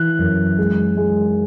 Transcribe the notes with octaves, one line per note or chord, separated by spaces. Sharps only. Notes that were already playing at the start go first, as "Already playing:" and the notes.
Already playing: E3 F#6
F#2
G#3
G#3